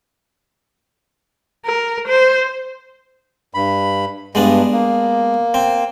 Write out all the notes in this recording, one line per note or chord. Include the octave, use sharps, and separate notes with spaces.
A#4
C5
G2 B5
G2 G#3 B3 D4
A#3
C4